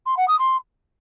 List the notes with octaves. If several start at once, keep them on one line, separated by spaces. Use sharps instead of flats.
C6
F#5
D#6
C6